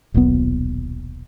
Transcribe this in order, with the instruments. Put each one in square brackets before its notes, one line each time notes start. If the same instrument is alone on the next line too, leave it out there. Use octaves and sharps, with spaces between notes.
[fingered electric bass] D#1 B1 A#2 B3